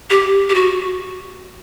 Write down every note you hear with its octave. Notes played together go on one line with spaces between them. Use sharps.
G4
G4
F#4